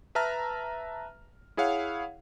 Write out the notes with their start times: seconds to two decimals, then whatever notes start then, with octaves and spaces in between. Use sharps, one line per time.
0.15 B4 E5 A5 A#5 F6
1.57 E4 G#4 C#5 F5 F#5